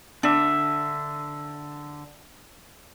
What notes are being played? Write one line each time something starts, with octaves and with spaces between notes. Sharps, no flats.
D3 D4 E5